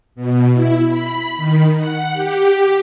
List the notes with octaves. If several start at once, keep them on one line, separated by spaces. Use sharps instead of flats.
B2
E4
B5
D#3
F#5
G4